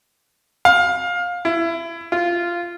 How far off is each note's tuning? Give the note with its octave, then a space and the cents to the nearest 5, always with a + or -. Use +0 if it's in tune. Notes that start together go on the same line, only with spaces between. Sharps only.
F5 +20
E4 +25
F4 -10